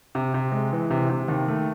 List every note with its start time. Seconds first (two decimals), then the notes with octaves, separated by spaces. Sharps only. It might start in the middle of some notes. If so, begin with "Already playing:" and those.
0.15 C3
0.34 C3
0.52 G#3
0.72 E3
0.90 C3
1.10 C3
1.28 D#2
1.48 A3